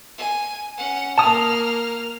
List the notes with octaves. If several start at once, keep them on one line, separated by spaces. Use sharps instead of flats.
G#5
C#4 F#5
A#3 A5 D#6 F6